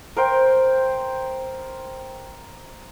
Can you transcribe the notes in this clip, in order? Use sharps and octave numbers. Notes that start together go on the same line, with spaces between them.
A#4 C5 G5